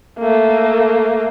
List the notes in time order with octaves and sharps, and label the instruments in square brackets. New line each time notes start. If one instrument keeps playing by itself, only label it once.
[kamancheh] A3 A#3